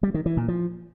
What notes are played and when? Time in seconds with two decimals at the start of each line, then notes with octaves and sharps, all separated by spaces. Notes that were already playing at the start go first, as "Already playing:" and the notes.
0.03 G3
0.14 D#3
0.26 E3
0.37 A#2
0.48 F3